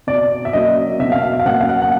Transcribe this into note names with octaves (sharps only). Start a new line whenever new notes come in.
B2 D5
E5
F#3 A#3 C#4 D#5
B2 E5
F5
E5
F5
F#3 A#3 C#4 F#5
F5
F#5
F#5